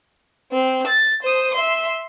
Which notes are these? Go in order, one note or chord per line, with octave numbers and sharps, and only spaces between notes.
C4
A6
C5 D#6
E5 C6